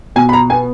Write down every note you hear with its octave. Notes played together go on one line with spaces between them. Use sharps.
B2 G#5
B5
A#5
B3 G#5